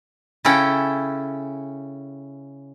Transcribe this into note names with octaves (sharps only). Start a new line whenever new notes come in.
C#3 C#4 E4 A4 G5